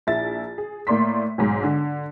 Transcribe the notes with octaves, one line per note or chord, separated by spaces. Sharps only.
A#1 E4 A6
G#4
A2 A#3 D5 C6 B6
B1 G#2
D3